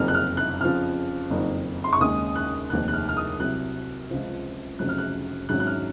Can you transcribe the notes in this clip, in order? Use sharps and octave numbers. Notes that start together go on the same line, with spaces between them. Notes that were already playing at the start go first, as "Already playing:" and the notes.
Already playing: F#1 F2 D#3 F6
F#6
F6
F#6
F2 C#3 F3 F6
F#1 F2 D#3
C6
C#6
D#2 C#3 G#3 D#6
F#6
F1 D#2 D#3 F#6
F#6
F6
F6
D#6
C2 C3 F#3 F#6
C#2 C3 F3 C4
F1 F2 C#3 F#3 C4 F#6
F6
F#6
G#1 G#2 F#3 C#4 F#6
F#6
F6